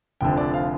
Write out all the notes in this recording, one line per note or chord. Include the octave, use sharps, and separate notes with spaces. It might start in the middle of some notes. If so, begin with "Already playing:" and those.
F1 F2 D3 G5
D5
F5